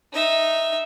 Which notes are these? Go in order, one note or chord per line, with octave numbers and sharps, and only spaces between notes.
D#4 E5